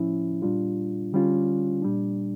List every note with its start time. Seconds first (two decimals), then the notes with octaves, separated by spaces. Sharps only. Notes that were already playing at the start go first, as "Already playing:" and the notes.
Already playing: A2 F3 C#4 E4
0.42 A#2 G3 D4 F4
1.13 D3 G3 C#4 F4
1.82 A#2 G3 D4